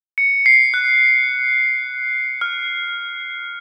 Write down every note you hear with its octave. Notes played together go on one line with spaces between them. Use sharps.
C#7
C7
F#6
F6